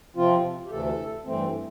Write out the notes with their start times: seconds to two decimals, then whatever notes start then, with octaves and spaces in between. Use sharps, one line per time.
0.17 C3 F3 C4 F4
0.66 G4
0.71 D2 C3 E3 A3 A4
1.26 G2 E3 A3 C4